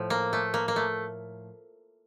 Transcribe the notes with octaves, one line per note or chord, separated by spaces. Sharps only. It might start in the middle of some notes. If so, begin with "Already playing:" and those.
Already playing: A2 F3
A#3
A3
A#3
A#3
A3